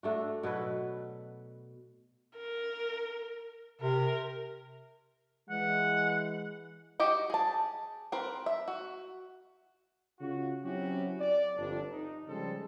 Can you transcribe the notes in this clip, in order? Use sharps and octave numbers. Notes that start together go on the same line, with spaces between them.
A3 D4 F#4
B2 F#3 A4 B4
A#4
C3 A#4
E3 G#3 F#5
F#4 G4 D#5
G#4 A5
C4 A#4 B4
E5
F#4
C#3 F4 F#4
F#3 C4 C#4 E4 F#4 G4
D5
G1 F2 D4
D#4
C#3 F3 G3 G#3 A4 C5